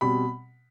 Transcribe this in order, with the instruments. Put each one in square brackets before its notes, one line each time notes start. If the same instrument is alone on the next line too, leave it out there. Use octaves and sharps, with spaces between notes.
[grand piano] B2 G3 C4 [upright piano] B5